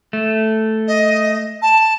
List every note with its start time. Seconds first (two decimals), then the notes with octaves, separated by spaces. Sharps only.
0.13 A3
0.87 D#5
1.61 A5